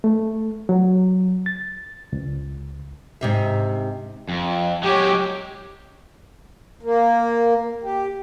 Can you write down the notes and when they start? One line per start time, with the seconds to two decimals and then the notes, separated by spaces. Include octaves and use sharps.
0.04 A3
0.69 F#3
1.46 A6
2.13 C#2
3.21 G#2 C3 E5
4.29 F2
4.83 F#3 G#3 G4 C#5
6.83 A#3
7.83 G4